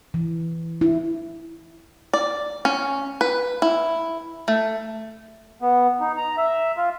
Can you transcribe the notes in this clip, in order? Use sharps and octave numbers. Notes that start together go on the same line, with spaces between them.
E3
E4
D5
C#4
B4
E4
A3
B3
D#4
A#5
E5
F4